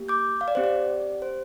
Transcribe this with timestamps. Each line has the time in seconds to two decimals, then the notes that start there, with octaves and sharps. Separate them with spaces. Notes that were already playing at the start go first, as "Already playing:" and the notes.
Already playing: A#3 G4
0.08 D6 G6
0.41 F5
0.48 D5
0.55 C4 G4 C5
0.64 D5
1.22 C5